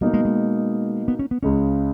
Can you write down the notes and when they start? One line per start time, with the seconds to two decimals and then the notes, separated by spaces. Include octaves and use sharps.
0.01 B2 G3 A#3 D#4
0.14 G#3
0.25 G#3
1.08 B3
1.19 C#4
1.31 B3
1.43 C#2 C#3 G#3 C#4